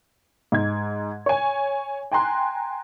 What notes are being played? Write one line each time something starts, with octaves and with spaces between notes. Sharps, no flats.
G#2 G#6
C#5 G#5
G5 G#5 A#5 C6 F#6